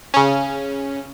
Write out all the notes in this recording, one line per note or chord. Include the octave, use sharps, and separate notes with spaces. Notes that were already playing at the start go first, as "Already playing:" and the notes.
C#3 C#4